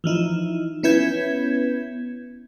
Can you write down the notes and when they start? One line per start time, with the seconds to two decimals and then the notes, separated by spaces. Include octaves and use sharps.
0.04 E3 F3 D#4 E4
0.83 B3 C#4 E4 B4 G6 G#6